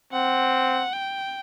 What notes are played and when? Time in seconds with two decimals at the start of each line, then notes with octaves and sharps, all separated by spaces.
0.13 C4 F#5
0.93 G5